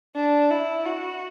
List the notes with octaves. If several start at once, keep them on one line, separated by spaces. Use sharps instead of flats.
D4
E4
F#4